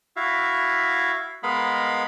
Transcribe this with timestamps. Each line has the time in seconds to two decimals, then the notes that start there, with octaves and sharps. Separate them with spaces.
0.16 E4 F#4 E5 F5
1.43 G#3 B3 A#4 D#5 F5 B5